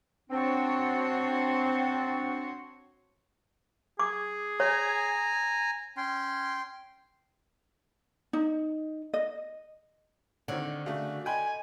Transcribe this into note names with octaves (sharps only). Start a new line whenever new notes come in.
C4 D4 F#4 C5 C#5
G#4 D6
C#5 G#5 A#5
C#4 G5 C6
D#4
D#5
D3 D#3 C4 C#5
C#3 A3 F#4
D#5 G5 G#5 B5 C6